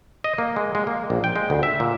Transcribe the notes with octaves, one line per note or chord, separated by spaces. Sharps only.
D#5
A#3
G#3
G#3
A#3
A#1
G5
G#3
D2
E5
A#2